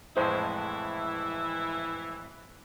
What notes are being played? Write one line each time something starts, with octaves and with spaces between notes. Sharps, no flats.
F2 A2 E3 G#3 E4 C5